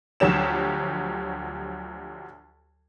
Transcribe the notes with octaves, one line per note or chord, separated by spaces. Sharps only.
D2 F3 F#3 G4 C#5 E7